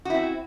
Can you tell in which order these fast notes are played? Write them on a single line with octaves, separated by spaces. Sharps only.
F#4 E4 C4